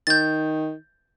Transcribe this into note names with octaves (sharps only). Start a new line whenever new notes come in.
D#3 G6 A6